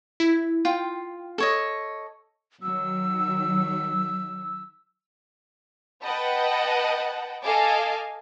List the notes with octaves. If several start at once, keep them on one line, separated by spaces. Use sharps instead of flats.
E4
F4 G5
A4 C#5 D#5
D#3 F#3 E6
B4 D#5 F#5 G5 A5
A4 D#5 F5 G#5 A5 D6